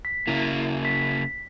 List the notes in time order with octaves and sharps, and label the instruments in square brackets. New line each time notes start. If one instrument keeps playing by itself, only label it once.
[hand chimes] B6
[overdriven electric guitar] C#3 A#3 [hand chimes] E4
[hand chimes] B6